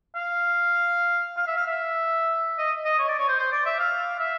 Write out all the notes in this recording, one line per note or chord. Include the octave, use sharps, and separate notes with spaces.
F5
F5
E5
F5
E5
D#5
D#5
C#5
D5
C#5
C5
C5
D5
E5
F5
E5